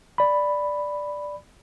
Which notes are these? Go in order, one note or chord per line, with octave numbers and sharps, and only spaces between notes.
D5 B5